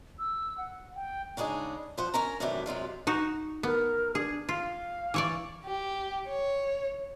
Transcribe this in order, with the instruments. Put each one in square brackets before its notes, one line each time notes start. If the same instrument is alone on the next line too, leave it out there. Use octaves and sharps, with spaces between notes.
[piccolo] E6
F#5
G5
[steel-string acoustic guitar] C#3 G#3 D4 D#4 G#4
F3 C5 F#5
C#4 A#4 A#5
F#2 C3 D#3 E3 A3 D4
F#2 C3 G#3 F4
[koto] D#4 F#4
[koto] B3 [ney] A#4
[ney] D4 [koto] G#4
[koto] F4 [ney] F5
[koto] E3 C#5 D5
[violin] G4
C#5